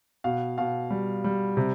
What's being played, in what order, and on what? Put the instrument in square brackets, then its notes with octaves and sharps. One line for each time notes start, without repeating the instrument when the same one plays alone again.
[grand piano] B2 F5
B2 F5
G3
G3
C3